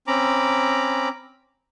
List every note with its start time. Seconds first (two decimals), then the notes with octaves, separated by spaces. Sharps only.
0.07 C4 C#4 A#5 B5 D6